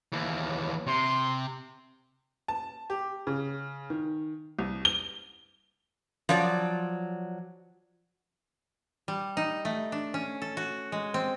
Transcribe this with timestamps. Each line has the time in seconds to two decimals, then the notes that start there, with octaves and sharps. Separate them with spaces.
0.12 D#2 E3
0.87 C3 C6
2.48 A5
2.90 G4
3.27 C#3
3.90 D#3
4.59 C2
4.85 G7
6.29 F3 F#3 D5
9.08 G3
9.37 D#4
9.65 A3
9.92 D4
10.14 C#4
10.42 A4
10.57 F#4
10.92 G#3
11.14 C4